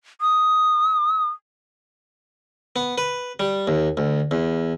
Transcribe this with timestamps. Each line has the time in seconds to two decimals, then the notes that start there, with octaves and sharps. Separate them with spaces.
0.21 D#6
2.76 B3
2.98 B4
3.40 G3
3.68 D#2
3.97 D2
4.31 E2